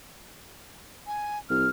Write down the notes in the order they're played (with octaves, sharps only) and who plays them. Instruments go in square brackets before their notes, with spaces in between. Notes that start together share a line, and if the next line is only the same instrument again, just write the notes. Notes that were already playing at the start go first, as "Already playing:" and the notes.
[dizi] G#5
[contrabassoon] C2 [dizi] F6